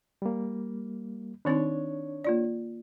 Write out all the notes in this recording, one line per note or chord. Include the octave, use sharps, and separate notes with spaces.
G3 A#3
D#3 C4 D4 D#4 C#5
A#3 F4 D5